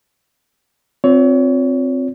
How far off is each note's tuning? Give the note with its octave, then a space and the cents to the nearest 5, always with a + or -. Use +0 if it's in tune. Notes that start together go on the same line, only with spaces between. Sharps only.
C4 +0 F4 +25 C#5 +35